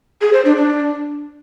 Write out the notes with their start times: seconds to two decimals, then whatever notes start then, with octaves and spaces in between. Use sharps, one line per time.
0.21 G#4
0.33 C5
0.45 D4
0.57 D4